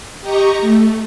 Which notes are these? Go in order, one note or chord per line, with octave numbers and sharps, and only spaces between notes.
G4 D#5 A#5 C#6
A3